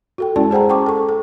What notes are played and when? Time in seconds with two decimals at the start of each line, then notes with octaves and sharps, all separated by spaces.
0.18 F#4 A4 G5
0.36 G#3 C#4 E4 D5 A5
0.51 G#4 C5 F#5 G5 A#5
0.70 G5 A5 C#6 D6
0.86 A4 C#6
1.09 A4